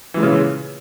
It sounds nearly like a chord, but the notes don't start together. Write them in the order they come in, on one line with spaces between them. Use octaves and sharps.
E3 G#3 A#2 C#3